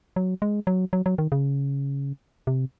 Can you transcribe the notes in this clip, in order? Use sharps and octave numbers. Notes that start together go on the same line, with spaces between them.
F#3
G#3
F#3
F#3
F#3
D#3
C#3
C3